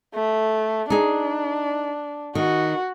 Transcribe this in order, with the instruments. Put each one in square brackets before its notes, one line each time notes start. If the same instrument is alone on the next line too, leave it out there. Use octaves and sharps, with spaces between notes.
[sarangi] A3
[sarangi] D4 [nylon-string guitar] D#4 G#4
[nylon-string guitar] D#3 [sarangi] F#4